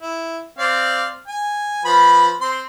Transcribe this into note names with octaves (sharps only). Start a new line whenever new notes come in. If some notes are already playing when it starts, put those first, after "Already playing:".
E4
C4 D5 F5
G#5
F3 B4 B5
C4 C6